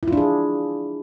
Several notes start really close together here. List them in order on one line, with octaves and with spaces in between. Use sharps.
E4 F4 D4 G#4